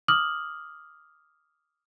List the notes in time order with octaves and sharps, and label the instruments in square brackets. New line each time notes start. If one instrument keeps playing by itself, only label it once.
[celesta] D6 D#6 F6 F#7